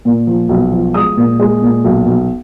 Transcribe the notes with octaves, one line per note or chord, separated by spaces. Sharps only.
A#2
F3
B1
F3
G#3 D#6
A#2
G#3
A#2
B1
B1